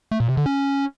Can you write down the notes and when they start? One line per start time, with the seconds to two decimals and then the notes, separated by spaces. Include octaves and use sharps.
0.11 A3
0.20 A#2
0.29 C3
0.37 D3
0.46 C#4